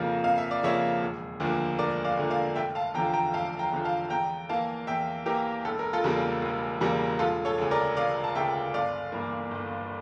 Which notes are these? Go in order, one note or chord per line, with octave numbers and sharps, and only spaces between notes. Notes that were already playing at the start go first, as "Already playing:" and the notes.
Already playing: F2 C#3 F3 A#3 F5
F2 F5
E5
D5
C#3 F3 A#3 C#5 E5
E1
D2 D3 F3 A#3
E1 A#4 D5
D5 F5
D2 D3 F3 A#3
D5 F5
F1 E5 G5
F5 A5
E2 D3 F3 G5 A#5
G5 A#5
F1 F5 A5
G5 A#5
E2 D3 F3
F5 A5
E2 G5 A#5
E3 A#3 F5 A5
E2 E5 G5
E3 A#3 G4 A#4
E1 A4
A#4
F4 A4
E2 C#3 G3 A#3
E1
E2 C#3 G3 A#3
E1 F4 A4
A4 C#5
D2 C#3
A#4 D5
E1 D5 F5
A5
D2 C#3 E5 G5
G1 D5 F5
G2 E3 A#3
G1